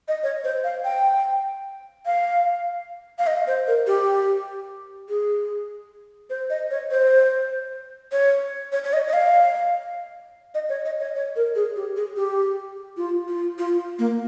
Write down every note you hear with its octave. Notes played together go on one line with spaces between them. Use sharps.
D#5
C#5
C5
F5
G5
F5
F5
D#5
C5
A#4
G4
G#4
C5
D#5
C#5
C5
C#5
C#5
C#5
D#5
D#5
F5
D#5
C#5
D#5
C#5
C#5
A#4
G#4
G4
G#4
G4
F4
F4
F4
A#3